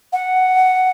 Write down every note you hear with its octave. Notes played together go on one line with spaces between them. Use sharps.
F#5